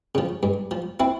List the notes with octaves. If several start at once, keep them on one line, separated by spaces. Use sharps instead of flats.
C#3 F3
G2
F3
C4 E4